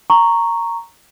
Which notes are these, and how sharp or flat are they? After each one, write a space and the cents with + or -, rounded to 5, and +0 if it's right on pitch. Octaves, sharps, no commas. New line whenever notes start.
A#5 -5 C#6 +0